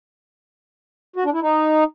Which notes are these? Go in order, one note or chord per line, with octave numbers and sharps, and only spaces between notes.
F#4
D4
E4
D#4